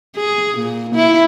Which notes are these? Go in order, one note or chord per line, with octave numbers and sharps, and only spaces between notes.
G#4
A#2
E4